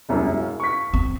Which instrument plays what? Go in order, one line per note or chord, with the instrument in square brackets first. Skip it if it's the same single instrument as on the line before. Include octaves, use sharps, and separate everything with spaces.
[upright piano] E1 C2 F#2
F5
C#6 B6
[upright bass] C4